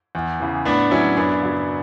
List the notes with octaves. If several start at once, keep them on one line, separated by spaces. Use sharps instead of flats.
E2
C#3 E3
A2 B3 D4
F#3 C#4 E4
F#2 B3 D4
C#3 F#3